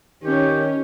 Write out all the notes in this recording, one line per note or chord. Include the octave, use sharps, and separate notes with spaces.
D#3 C#4 G4 C#5